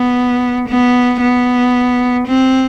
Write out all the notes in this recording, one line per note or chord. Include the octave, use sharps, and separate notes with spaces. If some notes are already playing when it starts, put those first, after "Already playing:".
Already playing: B3
B3
B3
C4